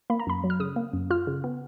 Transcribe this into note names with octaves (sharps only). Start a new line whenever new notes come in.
A#3 B5
A#5
F#2 B5
F#3
F6
C#3 D#6
A#3
F#2
F4 F6
C#3
B3